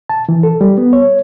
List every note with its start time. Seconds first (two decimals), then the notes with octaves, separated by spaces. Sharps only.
0.09 A5
0.29 E3
0.43 A4
0.61 G3
0.78 B3
0.93 C#5